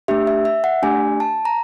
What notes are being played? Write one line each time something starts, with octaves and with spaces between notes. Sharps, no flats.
A3 D4 G4 E5
E5
E5
F#5
A3 D4 G4 G#5
A5
A#5